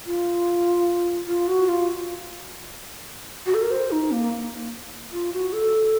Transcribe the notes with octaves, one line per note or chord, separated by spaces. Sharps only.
F4
F4
F#4
F4
F#4
A4
A#4
C5
D#4
A#3
F4
F#4
A4